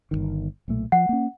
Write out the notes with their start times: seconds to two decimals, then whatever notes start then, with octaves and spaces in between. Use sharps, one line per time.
0.11 G1 C2 D#3
0.68 B1 A#2 A3
0.92 F3 F#5
1.09 A#3 C#4